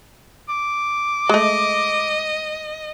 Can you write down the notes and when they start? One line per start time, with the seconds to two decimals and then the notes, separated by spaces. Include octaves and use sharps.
0.49 D6
1.29 G#3 A3 D#5